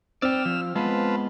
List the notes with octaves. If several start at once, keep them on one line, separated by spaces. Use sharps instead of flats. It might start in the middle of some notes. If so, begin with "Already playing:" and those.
C4 D5 G5 E6 F6
F3
G#3 B3 F4 B4 A5